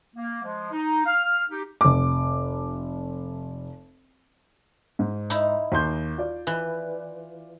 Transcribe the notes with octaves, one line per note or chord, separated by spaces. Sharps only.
A#3
F3 G#3
D#4
F5 F6
D#4 G4
F1 D6
G#2
D#4 E4
D#2 C6 G6
F4 D5
E3